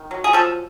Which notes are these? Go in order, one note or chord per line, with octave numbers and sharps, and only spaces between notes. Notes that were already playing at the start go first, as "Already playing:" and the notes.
Already playing: D#3
F#3
G#4
F3 A4